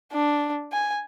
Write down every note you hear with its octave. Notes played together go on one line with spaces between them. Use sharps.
D4
G#5